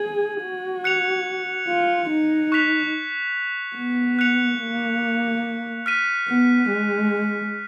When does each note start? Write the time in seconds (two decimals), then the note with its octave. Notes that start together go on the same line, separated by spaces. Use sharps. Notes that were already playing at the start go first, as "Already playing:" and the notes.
Already playing: G#4 G#6 D#7 F#7
0.42 F#4
0.84 F#6 C#7 F7
1.68 F4
2.09 D#4
2.52 C#6 F#6 B6 F7
3.77 B3
4.19 F#6 C#7 F7
4.60 A#3
5.86 F6 B6 D#7
6.28 B3
6.69 G#3